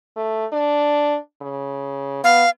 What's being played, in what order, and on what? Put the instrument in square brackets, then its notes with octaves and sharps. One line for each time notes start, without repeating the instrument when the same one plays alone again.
[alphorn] A3
D4
C#3
[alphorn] B3 [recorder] F5